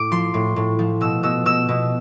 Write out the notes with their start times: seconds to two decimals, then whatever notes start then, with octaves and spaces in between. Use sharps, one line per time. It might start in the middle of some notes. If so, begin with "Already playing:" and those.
Already playing: A2 D6
0.11 F3 C6
0.34 A2
0.56 A2
0.79 F3
1.01 B2 E6
1.23 B2 E6
1.46 B2 E6
1.69 B2